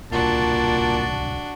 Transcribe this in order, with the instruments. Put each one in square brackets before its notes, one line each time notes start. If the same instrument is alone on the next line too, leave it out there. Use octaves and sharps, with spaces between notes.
[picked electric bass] D1 C2 [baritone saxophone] A#2 [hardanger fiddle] D4 F#4 [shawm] A5